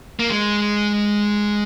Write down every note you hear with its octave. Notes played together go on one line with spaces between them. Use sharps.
A#3
G#3